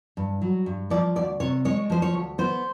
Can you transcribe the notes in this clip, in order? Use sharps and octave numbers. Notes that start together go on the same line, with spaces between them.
G2
F#3
G2
F3 D5
D2 D5
C3 C#5
G#3 C#5
F3 C5
C#5
D2
B3 C5